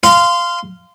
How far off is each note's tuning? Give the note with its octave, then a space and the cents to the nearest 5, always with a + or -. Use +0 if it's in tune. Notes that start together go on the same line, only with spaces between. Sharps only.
F5 -10 C6 -20